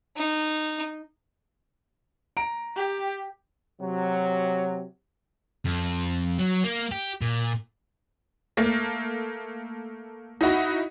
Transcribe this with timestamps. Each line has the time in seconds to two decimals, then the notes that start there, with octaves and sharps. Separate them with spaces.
0.17 D#4
2.37 A#5 D7
2.76 G4
3.80 C3 F#3
5.65 F2
6.39 F#3
6.64 A#3
6.92 G4
7.22 A#2
8.57 A3 A#3
10.41 D#4 E4 F#4